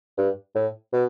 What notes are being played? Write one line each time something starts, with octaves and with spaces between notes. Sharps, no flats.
G2
A2
B2